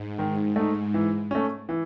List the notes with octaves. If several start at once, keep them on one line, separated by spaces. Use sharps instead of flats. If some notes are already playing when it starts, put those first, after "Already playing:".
Already playing: G#2
D#3
A3 D#4
E3
A3 C#4
E3